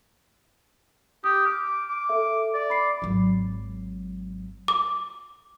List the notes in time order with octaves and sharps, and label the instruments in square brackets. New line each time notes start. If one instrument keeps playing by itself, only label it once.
[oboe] G4 [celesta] D#6
[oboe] D6 [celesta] F6
[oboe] D6
[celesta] A4 E5
[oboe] D5
[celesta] B5 C7
[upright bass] G#1 F#3
[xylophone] D6